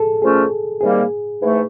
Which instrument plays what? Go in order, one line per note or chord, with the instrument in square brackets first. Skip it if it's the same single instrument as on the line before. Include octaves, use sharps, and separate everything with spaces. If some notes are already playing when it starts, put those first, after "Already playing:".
Already playing: [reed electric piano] G#4 A4
[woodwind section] A#2 F3 A3 C#4 [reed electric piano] G#4
[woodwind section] C3 D#3 G3 A#3 [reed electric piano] G#4
[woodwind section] G#2 E3 A3